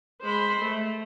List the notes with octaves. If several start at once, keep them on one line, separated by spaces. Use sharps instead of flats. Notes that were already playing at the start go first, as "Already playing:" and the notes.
G#3 C5 B5
A3